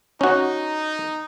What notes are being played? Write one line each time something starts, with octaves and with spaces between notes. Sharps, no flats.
C#4 D#4 F#4